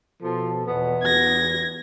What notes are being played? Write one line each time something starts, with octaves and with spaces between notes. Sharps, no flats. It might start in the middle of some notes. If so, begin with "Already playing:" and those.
B2 F3 A4
E2 B2 B3
E2 G#6 A#6